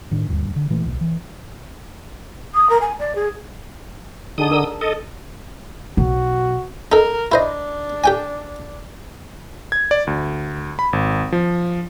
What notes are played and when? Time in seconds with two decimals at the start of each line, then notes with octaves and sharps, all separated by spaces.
0.11 A2 D#3 D4
0.28 D#1 D2 G2
0.56 D3
0.70 A#2 E3 A3
0.84 D1 B1
1.01 E3
2.54 D#6
2.69 A#4
2.81 G#5
2.99 D5
3.15 G#4
4.38 D3 D#4 G#4 A5 D#6
4.51 D4 A#4 E6
4.81 A4 D#5
5.97 B1 F#4
6.92 D#4 A4 A#4
7.32 D4 E4 C5 D#5
8.04 G4 G5 G#5
9.72 G#6
9.91 D5
10.07 D2
10.79 B5
10.93 G#1
11.32 F3